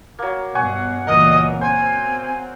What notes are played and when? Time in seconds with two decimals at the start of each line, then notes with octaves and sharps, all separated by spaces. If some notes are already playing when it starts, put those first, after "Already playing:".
0.19 F#3 A#3
0.55 G2 B2 F#5 G#5 C#6
1.07 C#2 A#2 E3 A#4 D#5
1.61 C4 C5 G#5